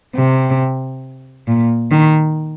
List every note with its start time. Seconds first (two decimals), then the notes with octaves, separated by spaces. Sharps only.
0.15 C3
1.48 A#2
1.91 D#3